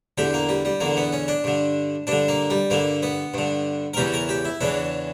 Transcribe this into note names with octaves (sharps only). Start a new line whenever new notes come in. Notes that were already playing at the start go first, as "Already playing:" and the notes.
E2 D3 G4
A#3
G3
G3
E2 D3 A#3
B3
C#4
D4
G2 D3
G2 D3 D4
A#3
G3
G2 D3 A#3
B3
G2 D3
A#4
E2 C#3 E3 G4
A#4
G4
E4
E2 C#3 E3 D4